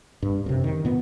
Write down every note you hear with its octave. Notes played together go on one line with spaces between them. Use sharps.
G2
F#2 C3
D#3
A#2 B3